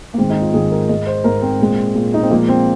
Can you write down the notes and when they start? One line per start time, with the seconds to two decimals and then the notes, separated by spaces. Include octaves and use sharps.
0.14 A#3
0.18 G#2 D#3 G#3 C4
0.30 D#4
0.41 F4
0.54 G#2 D#3 G#3 G#4
0.71 A#4
0.89 G#2 G#3 D#5
1.06 C5
1.24 G#2 G#3 A#4
1.42 C4
1.60 A#2 G#3
1.95 A#2 G#3
2.14 D#4
2.22 C4
2.30 A#2 F3 G#3 A#3
2.48 C4